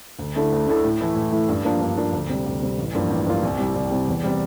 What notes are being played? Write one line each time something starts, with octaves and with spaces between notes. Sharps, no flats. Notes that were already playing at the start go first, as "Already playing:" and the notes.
D2
D3 A3 E4 A4
D2
D3 A3 E4 A4
A2
E3 A3 E4
A2
E3 A3 E4
G2
F3 A#3 D4
G2
F3 A#3 D4
D2
C3 G3
D2
C3 G3
A1
G2 F3 A#3 F4
A1
G2 F3 A#3 F4
C2
C3 G3
C2
C3 G3
E2
C3 G3